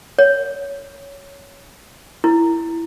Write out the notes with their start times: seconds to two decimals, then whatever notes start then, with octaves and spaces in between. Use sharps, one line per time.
0.19 C#5
2.24 E4